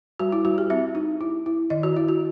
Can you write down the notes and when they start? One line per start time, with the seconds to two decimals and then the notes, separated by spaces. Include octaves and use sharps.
0.20 G3 F#4
0.32 E4
0.45 G3 F#4
0.58 G4
0.70 C4 E5
0.95 D#4
1.21 E4
1.46 E4
1.70 D#3 D#5
1.83 F#4
1.96 E4
2.08 F#4